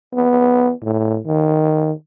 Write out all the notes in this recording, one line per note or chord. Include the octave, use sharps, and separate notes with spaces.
B3
A2
D#3